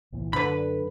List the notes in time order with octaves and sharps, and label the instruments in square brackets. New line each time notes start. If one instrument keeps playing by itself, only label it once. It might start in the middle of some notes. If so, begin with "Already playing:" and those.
[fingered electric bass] C2 A#2 E3
[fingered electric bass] F#2 [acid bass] D3 [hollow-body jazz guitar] B4 B5